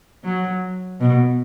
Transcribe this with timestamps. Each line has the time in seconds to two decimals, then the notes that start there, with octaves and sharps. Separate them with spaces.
0.24 F#3
1.00 B2